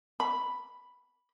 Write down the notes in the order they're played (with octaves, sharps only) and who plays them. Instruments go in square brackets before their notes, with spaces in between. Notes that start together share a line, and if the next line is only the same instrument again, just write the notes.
[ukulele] B5